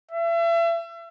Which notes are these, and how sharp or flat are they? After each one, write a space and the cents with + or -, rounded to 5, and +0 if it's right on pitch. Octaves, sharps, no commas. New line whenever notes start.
E5 +35